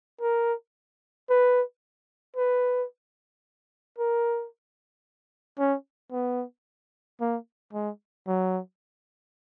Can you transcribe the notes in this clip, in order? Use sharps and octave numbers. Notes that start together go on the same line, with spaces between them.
A#4
B4
B4
A#4
C#4
B3
A#3
G#3
F#3